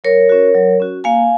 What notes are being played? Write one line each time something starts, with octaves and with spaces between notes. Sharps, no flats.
F#3 A#4 C#5
C#4 F#4
F#3
C#4 F#4
A#3 F5 G#5